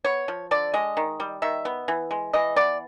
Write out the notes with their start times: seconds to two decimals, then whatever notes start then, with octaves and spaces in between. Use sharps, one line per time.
0.04 B3 C#5
0.28 F3
0.51 D3 D5
0.74 G#3 D#5
0.97 D#3
1.20 G3
1.42 D#3 E5
1.65 B3
1.88 E3
2.11 G#3
2.33 E3 D#5
2.56 B3 D5